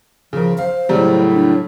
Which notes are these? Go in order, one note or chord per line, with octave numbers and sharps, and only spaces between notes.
C#3 F3 A#4
C5 F5
A2 C#3 F#3 G3
D4